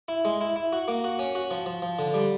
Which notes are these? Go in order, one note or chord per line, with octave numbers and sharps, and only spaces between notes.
E4
G#3
E4
E4
F#4
A#3
F#4
C#4
F#4
F3
F3
F3
D3
G3